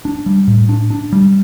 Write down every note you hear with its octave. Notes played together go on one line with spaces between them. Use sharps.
D4
G3
A2
D4
D4
G3